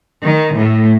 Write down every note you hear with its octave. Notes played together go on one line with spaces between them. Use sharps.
D#3
A2